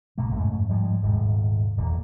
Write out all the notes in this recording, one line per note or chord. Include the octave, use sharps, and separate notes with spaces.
A#1 C3 A3 A#3
F2 G#2 A3 C#4
G#2 F3 G3 G#3
D#1 G#2 C3
D#1 E2 G3 A#3